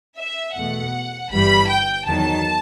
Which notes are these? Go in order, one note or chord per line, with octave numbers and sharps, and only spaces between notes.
E5
E2 B2 A3 F#5
G1 G2 E3 G3 B5
G5
E2 D#3 F#3 A5